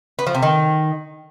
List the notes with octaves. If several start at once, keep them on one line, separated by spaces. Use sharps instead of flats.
B3
F3
C3
D#3